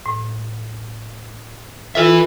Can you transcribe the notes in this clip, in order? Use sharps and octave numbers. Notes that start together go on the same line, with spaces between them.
A2
E4 F4 A4 B4 E5